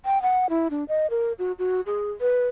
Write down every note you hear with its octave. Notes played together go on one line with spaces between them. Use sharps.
G5
F#5
E4
D4
D#5
A#4
F#4
F#4
G#4
B4